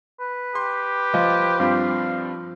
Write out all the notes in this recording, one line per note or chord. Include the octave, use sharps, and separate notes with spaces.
B4
G4 C6
F3 D#5
G2 C4 F4 F5